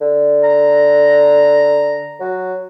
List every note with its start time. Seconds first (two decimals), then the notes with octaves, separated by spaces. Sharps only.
0.01 D3
0.44 A#5
2.20 F#3